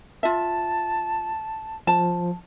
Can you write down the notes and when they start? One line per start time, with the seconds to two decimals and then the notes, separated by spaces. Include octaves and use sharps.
0.23 F4 E5 A5
1.87 F3 A5